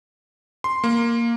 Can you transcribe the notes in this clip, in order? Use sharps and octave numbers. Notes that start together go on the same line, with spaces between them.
C6
A#3